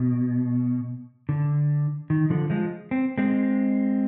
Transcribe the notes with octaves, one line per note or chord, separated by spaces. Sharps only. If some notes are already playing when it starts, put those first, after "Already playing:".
Already playing: B2
D3
D#3
D3 F3
F3 G#3
C4
G#3 C4